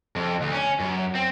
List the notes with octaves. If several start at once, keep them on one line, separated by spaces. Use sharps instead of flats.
F2
D2
C#4
F#2
C4